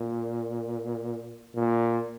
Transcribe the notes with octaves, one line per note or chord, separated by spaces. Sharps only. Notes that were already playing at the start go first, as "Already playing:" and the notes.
Already playing: A#2
A#2